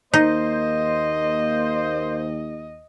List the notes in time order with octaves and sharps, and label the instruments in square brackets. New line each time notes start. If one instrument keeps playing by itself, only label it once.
[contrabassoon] D#2 [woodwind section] A#3 C5 [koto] D#4 [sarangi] D#5